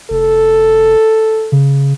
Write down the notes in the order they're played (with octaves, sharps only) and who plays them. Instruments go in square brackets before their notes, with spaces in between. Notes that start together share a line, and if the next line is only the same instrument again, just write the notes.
[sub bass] F1 [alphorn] A4
[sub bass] C#3